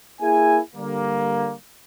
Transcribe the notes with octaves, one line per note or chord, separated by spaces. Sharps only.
A#3 E4 G#4 G#5
D3 G3 A#3